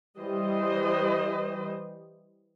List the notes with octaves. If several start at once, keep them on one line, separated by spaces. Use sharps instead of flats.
E3 G3 C5 D#5